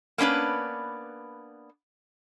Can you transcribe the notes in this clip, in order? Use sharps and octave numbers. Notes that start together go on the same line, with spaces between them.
A#3 B3 C#4 D4 B4